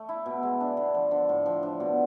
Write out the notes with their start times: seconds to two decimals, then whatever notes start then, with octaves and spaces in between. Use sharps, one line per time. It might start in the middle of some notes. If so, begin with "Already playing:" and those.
Already playing: A3
0.09 E4
0.26 B2
0.43 G#3
0.60 D4
0.77 D3
0.94 F3
1.11 D3
1.29 A2
1.46 F3
1.63 D4
1.80 B2